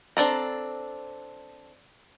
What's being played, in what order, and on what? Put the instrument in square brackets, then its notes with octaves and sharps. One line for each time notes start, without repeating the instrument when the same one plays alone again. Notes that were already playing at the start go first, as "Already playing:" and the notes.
[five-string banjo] C4 D4 A4 A#5